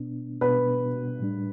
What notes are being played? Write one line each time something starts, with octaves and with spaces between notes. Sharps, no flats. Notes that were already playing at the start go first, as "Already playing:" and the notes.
Already playing: B2 B3 D4
B2 B3 D4 B4
A2 G3 D4